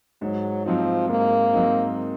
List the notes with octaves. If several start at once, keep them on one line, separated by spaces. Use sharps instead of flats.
G#2 F#3
F3 F#3 C4 D#4
G#2 A#3
F#3 C4 D#4